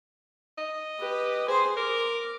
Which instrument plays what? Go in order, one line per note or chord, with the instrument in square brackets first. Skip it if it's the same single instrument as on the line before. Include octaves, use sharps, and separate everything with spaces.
[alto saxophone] D#5
[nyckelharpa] G4 B4
[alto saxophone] G#4 [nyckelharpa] C5 C6
[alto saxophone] A#4 [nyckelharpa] D6